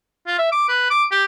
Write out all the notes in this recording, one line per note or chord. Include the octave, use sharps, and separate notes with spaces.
F4
E5
D6
B4
D6
G4